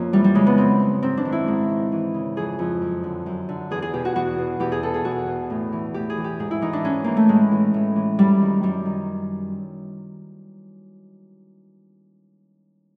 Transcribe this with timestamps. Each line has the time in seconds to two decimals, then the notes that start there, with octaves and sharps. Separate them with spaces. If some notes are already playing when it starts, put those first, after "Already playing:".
Already playing: F2 A#3 C#4
0.13 E3 G3
0.24 G3
0.35 C#3 G#3
0.47 B3
0.57 F#2 C4
0.80 F#2
1.02 G#2 C4
1.17 D4
1.25 D#3
1.32 E4
1.48 G#2
1.70 D#3
1.92 E3
2.14 C#3
2.37 F2 G#4
2.59 F2
2.82 F#2
3.04 D3
3.26 F#2
3.49 D3
3.71 E2 G#4
3.82 G#4
3.93 B2 G4
4.05 F#4
4.15 E2 F#4
4.38 B2
4.60 E2 G4
4.72 G#4
4.83 B2 A4
4.94 G#4
5.05 E2 F#4
5.27 B2
5.50 A2
5.72 E3
5.94 A2 G4
6.10 G#4
6.17 E3
6.24 G4
6.39 G#2 G#4
6.51 E4
6.62 E3 D#4
6.73 D4
6.84 G#2 C#4
7.04 E3 A#3
7.17 A3
7.29 A2 G#3
7.51 E3
7.74 A2
7.96 E3
8.18 F#2 G3
8.41 D#3
8.63 F#2 G3
8.86 D#3